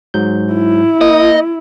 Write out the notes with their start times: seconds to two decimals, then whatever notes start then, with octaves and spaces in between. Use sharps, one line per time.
0.14 G#2 F#3 G6
0.53 E4
1.01 A#3 D#5